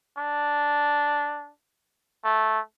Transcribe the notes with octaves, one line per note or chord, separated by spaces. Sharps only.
D4
A3